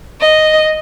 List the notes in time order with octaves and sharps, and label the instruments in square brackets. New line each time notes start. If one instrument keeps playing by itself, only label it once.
[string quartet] D#5